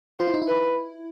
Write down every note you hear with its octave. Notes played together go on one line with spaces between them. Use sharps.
F4 C5
E4
D#4
E4
B4